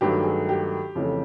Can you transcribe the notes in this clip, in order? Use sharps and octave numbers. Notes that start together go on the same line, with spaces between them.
G2 D#3 F#3 A3 G4
G#4
G4
F2 C#3 E3 A3